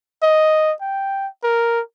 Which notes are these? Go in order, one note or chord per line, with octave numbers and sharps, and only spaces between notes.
D#5
G5
A#4